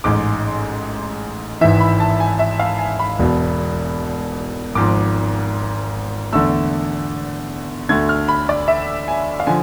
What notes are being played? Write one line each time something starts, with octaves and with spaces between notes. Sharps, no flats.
A1 G#2 G#3 D6
G#1 G#2 E3 E5
B5
A5
G#5
E5
F5
G#5
B5
E1 E2 B2
G#1 G#2 F3 D6
E2 D3 A3 E6
D2 D3 A3 G#6
F6
B5
D5
E5
G#5
F5
D3 F3 G#5